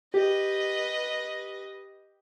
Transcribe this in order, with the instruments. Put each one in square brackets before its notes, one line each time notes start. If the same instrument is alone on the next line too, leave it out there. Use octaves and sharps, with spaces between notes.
[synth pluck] G4 [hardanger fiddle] B4 D#5